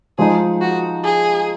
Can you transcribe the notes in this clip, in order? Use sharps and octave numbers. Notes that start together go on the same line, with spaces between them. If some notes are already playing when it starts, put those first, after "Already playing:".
F3 G#3 D#4 G#4
F#4
G#4